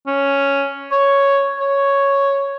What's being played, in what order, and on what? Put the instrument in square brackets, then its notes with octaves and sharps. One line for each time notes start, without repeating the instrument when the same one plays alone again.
[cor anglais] C#4
C#5
C#5